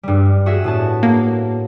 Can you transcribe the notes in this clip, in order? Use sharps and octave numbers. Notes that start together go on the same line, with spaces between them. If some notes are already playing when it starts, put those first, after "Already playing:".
G2 G3
F#4 G#4 E5
A2 B3 A5
A#3